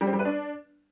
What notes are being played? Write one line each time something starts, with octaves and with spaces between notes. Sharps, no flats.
G3
C4
G3
B4
D4